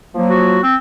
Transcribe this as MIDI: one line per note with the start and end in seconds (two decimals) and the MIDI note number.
0.14 0.59 53
0.14 0.59 54
0.14 0.59 58
0.30 0.61 66
0.63 0.75 60